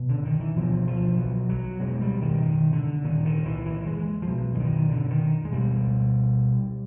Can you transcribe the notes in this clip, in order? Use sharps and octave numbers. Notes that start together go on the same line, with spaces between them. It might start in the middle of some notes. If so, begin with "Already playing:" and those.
Already playing: B2
D3
D#3
E3
B2 F3
F3
F#3
F#3
B2 G#3
G3
D#3
D#3
D3
A#2 D#3
D#3
E3
E3
G#3
F3
B2 F#3
E3
D#3
D3
D#3
G#3
B2 G3